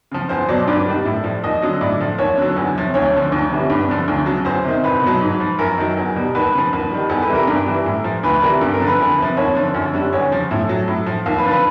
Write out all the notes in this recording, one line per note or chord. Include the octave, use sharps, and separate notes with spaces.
C#3 F3
E2 C5
B2 F#3 D5
G2 D5
D#3 G3
A2
F3
D#2 D#5
D3 F#3
A2 D5
F3
D#2 C#5
D3 F#3
E2
C3 F3
D2 C#5
D3 F3
D2
C3 E3 G3
G2
D3 F3
D2
C#3 F#3
E2 C5
C3 D#3
C2 B4
B2 F#3
G#2
F3
F#2 A#4
D#3 F#3
E2
B2 G3
D#2 B4
C#3 F3
D#2
D#3 G3
E2 A4
B4
C3 E3 G3
A#4
G2
E3 G3
A2
F3
D2 B4
C3 E3 G3 A#4
G2 A4
A#4
D3 F3
B4
E2
C3 F3
D#2 C#5
D3 F3
F#2
D3 G3
E2 C#5
C#3 F3
A2
F#3
A2
F3
D#2 F5
B4
D3 F3
B4